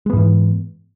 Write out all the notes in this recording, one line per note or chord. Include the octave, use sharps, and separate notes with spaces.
G#2 E3 G#3 B3